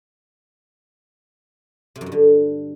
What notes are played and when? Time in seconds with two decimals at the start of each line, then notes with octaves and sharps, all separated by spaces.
1.96 C3
2.01 F#2
2.06 G2
2.12 D3